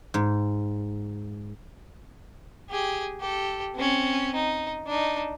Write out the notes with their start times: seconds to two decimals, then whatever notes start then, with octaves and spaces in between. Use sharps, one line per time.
0.14 G#2
2.70 G4 G#4
3.20 G4 A4
3.75 C4 C#4
4.34 D#4
4.87 D4 D#4